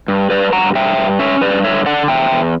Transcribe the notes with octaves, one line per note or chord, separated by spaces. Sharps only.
G2
G2 B4 D5
G2 F#5 A#5
G2 E5 G5
G2
C#4 C#5 E5
G2 B4 D5
D3 C#5 E5
D3 D5 F#5
E2 E5 G5
E2